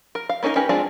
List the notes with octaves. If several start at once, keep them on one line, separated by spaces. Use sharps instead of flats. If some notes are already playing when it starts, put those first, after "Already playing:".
A#4
F5
A#3 C#4 D#4 A4 A#4
C#4 D#4 G4 A#4 B4
G#3 C4 D4 F4 G#4